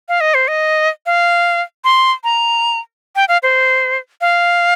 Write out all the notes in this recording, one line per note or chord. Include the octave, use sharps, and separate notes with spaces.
F5
D#5
C5
D#5
F5
C6
A#5
G5
F5
C5
F5